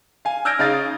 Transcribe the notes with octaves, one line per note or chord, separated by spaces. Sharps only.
F5 G#5
E6 F6 G6 G#6 A#6 D7
C#3 D#4 F5 A6